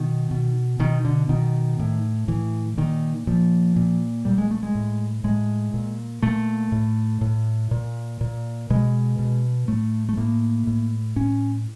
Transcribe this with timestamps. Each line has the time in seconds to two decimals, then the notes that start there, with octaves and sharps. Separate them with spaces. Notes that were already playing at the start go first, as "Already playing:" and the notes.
Already playing: B2 D#3
0.31 B2
0.79 B2 D#3
1.05 D3
1.29 B2 D#3
1.79 A2
2.28 A2 E3
2.77 A#2 D#3
3.27 A#2 F3
3.76 A#2
4.25 A#2 G3
4.38 G#3
4.51 A3
4.63 G#3
4.75 A2
5.24 A2 G#3
5.74 A#2
6.22 A#2 A3
6.72 A2
7.21 A2
7.71 A#2
8.21 A#2
8.70 B2 G#3
9.19 B2
9.68 A2 A3
10.09 A3
10.17 A2 A#3
10.67 A2
11.16 A2 C#4